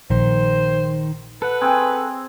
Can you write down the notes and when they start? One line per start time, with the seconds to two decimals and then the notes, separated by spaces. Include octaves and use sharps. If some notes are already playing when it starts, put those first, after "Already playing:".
0.10 A#1 D#3 C5
1.42 A4 B4 F#5
1.61 C4 G#4